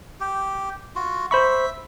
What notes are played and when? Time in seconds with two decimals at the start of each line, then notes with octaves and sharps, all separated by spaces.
0.20 G4
0.96 F4 F#4
1.31 C5 E5 B5 C#6 E6